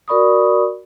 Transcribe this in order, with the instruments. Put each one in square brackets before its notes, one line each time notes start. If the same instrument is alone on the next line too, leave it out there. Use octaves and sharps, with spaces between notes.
[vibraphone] F#4 A#4 D5 B5 C#6 D#6